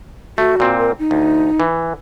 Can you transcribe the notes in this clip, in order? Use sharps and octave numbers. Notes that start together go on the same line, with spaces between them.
A3 F#4
A#2 C4
A#4
D#4
D2
E3